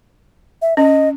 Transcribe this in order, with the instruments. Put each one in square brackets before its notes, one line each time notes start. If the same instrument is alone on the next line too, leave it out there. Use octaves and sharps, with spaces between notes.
[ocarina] E5
[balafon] C#4 [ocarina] D#5